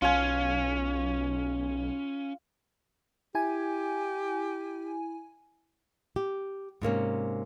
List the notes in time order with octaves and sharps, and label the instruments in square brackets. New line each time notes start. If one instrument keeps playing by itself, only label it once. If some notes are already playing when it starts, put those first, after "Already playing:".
[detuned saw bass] B1 [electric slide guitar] C#4 [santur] F4 G#5
[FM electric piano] E4 G#5 [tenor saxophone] G4
[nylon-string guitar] G4
G#2 C3 A#3 C#4